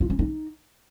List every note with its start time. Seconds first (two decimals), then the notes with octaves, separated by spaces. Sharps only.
0.01 F4
0.10 C#4
0.19 D#4